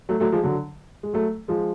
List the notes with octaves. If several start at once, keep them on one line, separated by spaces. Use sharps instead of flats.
F#3 A3
F#3 A3
F3 G#3
D3 F#3
G#3
F#3 A3
F3 G#3